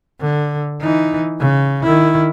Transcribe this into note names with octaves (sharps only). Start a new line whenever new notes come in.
D3
E3 D#4
C#3
D#3 E4